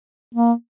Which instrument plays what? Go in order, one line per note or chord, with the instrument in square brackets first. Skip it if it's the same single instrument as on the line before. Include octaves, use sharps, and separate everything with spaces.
[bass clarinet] A#3